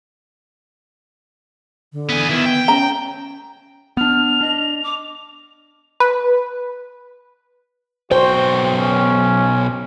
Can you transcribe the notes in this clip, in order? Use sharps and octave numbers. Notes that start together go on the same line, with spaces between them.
D3
B3 G#4
D#3 B3 E4
G5
C#4 A#5
B3 D4 F6 F7
D4 D#5
D6
B4
B1 F#4 C5 G5
C#4